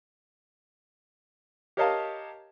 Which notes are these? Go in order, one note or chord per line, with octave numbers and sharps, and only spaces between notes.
G4 A#4 C#5 D#5 F5 A5